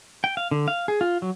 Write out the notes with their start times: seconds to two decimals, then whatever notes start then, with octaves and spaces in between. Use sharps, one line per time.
0.24 G5
0.37 F5
0.51 D3
0.68 F5
0.88 G#4
1.01 F4
1.22 F#3